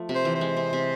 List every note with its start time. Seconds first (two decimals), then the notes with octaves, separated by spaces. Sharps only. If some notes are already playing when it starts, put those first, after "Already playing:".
Already playing: F3 A3
0.09 C3
0.15 C5
0.25 E3
0.35 C5
0.41 G#3
0.57 C3
0.73 C3